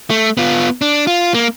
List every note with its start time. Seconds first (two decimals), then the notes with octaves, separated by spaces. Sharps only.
0.10 A3
0.37 B3 F4
0.82 D4
1.07 F4
1.34 A#3